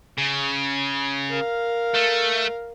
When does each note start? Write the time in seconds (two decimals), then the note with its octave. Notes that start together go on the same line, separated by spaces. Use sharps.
0.18 C#3
1.29 A#4 F5
1.94 A3